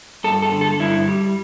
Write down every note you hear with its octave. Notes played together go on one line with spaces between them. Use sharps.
G2 A4
A4
D3
A4
G2 E4
G3